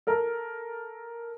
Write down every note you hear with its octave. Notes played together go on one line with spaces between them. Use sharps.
A4 A#4